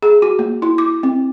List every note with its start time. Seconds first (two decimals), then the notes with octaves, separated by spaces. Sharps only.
0.03 G#4
0.22 F#4
0.39 A#3
0.62 E4
0.78 D6
1.03 C4